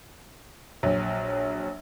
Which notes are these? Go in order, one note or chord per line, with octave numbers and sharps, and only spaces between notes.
A#1 F#3